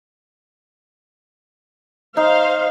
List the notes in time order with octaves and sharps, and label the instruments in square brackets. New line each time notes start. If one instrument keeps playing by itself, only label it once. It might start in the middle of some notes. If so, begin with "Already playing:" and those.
[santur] D#4 [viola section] C5 F5